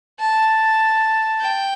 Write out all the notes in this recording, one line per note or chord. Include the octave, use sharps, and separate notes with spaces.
A5
G5